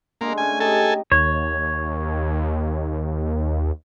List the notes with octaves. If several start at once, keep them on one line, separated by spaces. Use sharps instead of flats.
D3 G#3 A#3
C#3 A3 G#5
D#4 G4 A4 D#5 G#5
D#2 C#5